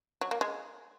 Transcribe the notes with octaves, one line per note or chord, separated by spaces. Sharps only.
F#3
A#3
G#3